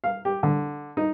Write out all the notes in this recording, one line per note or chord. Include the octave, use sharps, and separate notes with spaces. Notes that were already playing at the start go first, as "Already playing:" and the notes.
F5
G4
D3
D#4